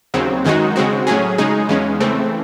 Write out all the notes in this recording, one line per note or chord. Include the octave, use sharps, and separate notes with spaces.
D#2 C#3 F#3 C4
F#2 D#3 G#3 D#4 F#4
C#3 G#3 C4 F#4
A2 F#3 C#4 G#4
C#3 G#3 D#4 G#4
E2 C#3 G#3 C#4
C#3 E3 A3 C4